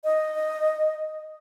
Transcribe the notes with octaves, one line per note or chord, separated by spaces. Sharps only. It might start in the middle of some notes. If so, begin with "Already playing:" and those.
D#5